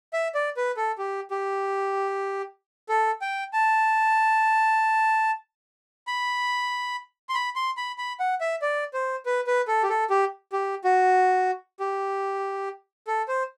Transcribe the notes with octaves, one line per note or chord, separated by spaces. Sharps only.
E5
D5
B4
A4
G4
G4
A4
G5
A5
B5
C6
B5
C6
B5
B5
F#5
E5
D5
C5
B4
B4
A4
G4
A4
G4
G4
F#4
G4
A4
C5